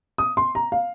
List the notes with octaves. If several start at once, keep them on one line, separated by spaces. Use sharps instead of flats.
D#6
C6
A#5
F5